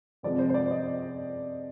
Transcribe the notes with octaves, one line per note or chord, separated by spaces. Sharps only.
C3 F3 G#3 C4 D5
C5
C5
D5
D#5